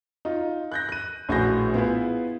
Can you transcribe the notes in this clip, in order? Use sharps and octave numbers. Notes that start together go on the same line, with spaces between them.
D#4 F4
F#6 G6 A#6
F#6 D#7
A#1 A2 F#4 G#4 G6 A#6
B3 E4 F4 G#4 B4